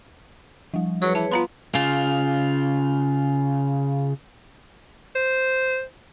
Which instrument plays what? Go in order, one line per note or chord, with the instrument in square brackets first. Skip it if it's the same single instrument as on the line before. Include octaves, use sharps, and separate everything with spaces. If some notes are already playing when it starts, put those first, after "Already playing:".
[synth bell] F3 G3
[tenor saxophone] F#3 [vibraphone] G#4 B4 C#5
[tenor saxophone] E3 [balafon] A5
[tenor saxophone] B3 [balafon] F4 A#5 C6 [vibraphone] F5
[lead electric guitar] C#3 F4
[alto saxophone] C5